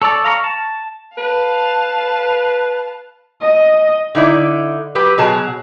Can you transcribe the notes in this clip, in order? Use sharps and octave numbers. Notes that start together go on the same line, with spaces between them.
A4 C#5 D5 A5
F5 A#5 B5 C#6
A5
B4 F5 A5
D#5
D3 D#4 E4 D5
F#3 G4 B4
B2 F#3 G#4 A5